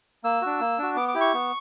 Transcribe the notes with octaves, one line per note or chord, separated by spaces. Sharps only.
A#3 E6
D4 F#4
A#3
D4 F#4
B3 D6
D6
E4 G4
C#6
B3